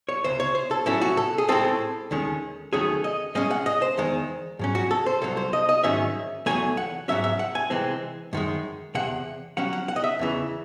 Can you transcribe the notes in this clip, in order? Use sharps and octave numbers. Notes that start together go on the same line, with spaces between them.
C#5
C#2 C3 C5
C#5
C5
A4
A2 F#3 C#4 E4
F#4
A4
G#4
A2 G#3 C4 A4
D#2 D#3 G#3 C#4
D#2 D#3 F#3 A3 C#4 G#4
D#5
A2 G#3 C#4 D#5
F#5
D#5
C5
E2 D#3 G#3
G#2 F#3 C#4
F#4
A4
C5
C2 C3 D#3 F#3 A4
C5
D#5
D#5
G#2 D#3 F#3 C#4 E5
E2 C3 F#3 A3 G#5
F#5
G#2 F#3 C#4 E5
E5
F#5
G#5
C3 E3 G#3 C4
F#2 D#3 G#3
E2 C3 F#5
C3 F#3 C#4 F#5
F#5
F#5
D#5
E5
E2 C#3 E3